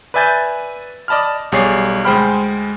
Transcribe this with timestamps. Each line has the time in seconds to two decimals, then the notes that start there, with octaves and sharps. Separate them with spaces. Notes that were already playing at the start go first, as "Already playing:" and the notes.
0.14 B4 D5 E5 G#5 G6 A6
1.08 D5 D#5 A5 B5 F6
1.52 B1 G3 G#4 C#5 D5 C7
2.04 D2 G#3 C5 G5 B5 F6